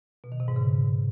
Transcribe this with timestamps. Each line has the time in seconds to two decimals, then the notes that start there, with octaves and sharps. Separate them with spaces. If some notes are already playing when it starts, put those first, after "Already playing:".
0.24 B2
0.32 D#3
0.40 C3
0.48 G#2
0.56 C#3